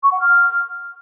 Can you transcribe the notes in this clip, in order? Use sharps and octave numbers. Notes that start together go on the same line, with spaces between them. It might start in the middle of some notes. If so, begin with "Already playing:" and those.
C#6
F#5
F6